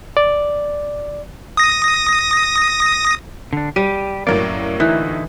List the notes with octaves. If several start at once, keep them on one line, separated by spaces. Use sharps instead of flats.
D5
D#6 A#6
D3 D4
G3 G4 D#7
F#2 A2 F#3 A#3 D5
D3 E3 D#4 E4